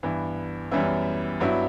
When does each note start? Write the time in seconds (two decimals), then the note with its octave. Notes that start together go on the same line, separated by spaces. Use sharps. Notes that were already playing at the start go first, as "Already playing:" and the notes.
0.03 G2 E3 B3
0.71 F#2 E3 G3 B3 E4
1.40 G2 F#3 B3 E4